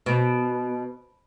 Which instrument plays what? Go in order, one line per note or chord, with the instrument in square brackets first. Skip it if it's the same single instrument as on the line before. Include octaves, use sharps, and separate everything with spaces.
[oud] B2